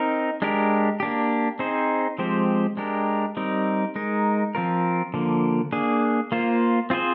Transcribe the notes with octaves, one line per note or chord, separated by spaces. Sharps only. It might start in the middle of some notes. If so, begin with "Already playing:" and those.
Already playing: C4 D#4 A#4
G#3 D4 G4 A#4
A#3 D4 G4
C4 D#4 G#4 C5
F3 G#3 C4 G4 C5
G#3 D4 G4 A#4
G3 C4 D#4 A#4
G#3 D#4 A#4
F3 C4 F4 A#4
D3 F3 A#3
A#3 D4 G#4
A#3 F4 C5
C4 F4 G#4 C5